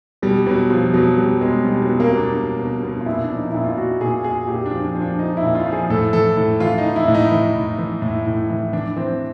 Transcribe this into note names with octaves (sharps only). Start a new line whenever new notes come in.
B2 G3
B2 F#3
B2 F3
B2 F#3
B2 G3
B2 G#3
B2 G3
F#3
B2
A#3
B2
D4
B2
B2
B2
F4
A#2 E4
D4
F3
D#4
A#2 E4
F4
A#2 F#4
A#2 G#4
A#2 G#4
A#2 G4
D4
F3
D4
F3
D4
F3 D#4
E4
A#2
F4
F3
G#4
A2 A4
E3 A4
A2 A4
E3 F4
D#4
E3
E4
A2
D#4
E3
A2
E3
A2
A2
E3
E3 D4
E3 C4